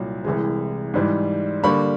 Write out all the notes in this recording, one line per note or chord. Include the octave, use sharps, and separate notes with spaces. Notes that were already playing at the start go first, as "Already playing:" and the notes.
Already playing: C2 A#2 F#3
C2 C3 E3 G#3
G#2 E3 G3
D3 G3 A#3 B5 C#6